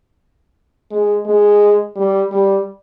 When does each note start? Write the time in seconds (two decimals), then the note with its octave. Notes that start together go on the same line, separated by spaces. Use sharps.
0.91 G#3
1.26 G#3
1.96 G3
2.32 G3